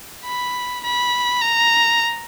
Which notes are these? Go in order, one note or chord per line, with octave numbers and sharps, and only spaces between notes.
B5
B5
A#5